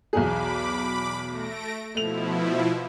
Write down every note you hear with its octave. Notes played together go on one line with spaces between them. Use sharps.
B1 E2 G#4 B5 D6
A3 A#6 D7
B2 F3 A3 E4 F7